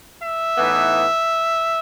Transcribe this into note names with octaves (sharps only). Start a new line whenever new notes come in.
E5
A2 E3 B3 D#4